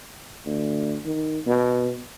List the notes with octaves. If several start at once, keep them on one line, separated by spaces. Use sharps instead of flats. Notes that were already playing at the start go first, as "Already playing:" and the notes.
D2
D#3
B2